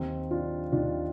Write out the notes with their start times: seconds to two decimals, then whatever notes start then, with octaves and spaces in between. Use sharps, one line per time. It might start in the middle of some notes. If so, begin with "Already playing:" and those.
Already playing: D#2 D#3 C4 D#4
0.31 D4 F4
0.72 D#2 D#3 D4 F4